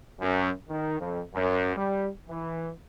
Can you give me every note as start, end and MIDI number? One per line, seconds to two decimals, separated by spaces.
0.20 0.50 42
0.68 0.97 51
0.99 1.21 41
1.34 1.74 42
1.76 2.08 55
2.28 2.70 52